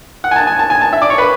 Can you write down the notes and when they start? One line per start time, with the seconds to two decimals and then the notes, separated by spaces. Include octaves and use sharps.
0.24 F#5
0.31 G#5
0.36 A5
0.47 G#5
0.59 A5
0.70 G#5
0.81 A5
0.93 E5
1.02 D5
1.10 C#5
1.18 B4